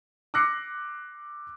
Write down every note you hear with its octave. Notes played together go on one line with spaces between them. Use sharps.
D6 E6 F#6 A#6 C7 C#7